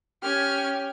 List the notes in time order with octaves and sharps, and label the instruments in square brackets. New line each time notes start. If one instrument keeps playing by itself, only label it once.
[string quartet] C#4 F6 G#6 [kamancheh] G4